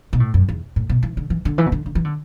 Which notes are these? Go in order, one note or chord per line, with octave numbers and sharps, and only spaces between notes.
B2
A2
F#2
E2
A2
B2
E3
D3
E3
D3
E3
B2
D3
D3
E3
D3